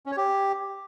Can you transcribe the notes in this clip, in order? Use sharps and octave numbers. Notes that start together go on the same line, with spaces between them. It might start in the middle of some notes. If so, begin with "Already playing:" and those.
C#4
C#5
G4